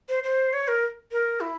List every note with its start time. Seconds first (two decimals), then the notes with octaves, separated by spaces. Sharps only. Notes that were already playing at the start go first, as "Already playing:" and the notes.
0.09 C5
0.24 C5
0.53 C#5
0.68 A#4
1.12 A#4
1.41 E4